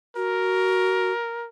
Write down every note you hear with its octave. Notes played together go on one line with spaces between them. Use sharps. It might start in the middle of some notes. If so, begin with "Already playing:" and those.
F#4 A#4